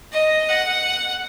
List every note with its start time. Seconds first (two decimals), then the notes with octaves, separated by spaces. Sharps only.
0.13 D#5
0.49 F#5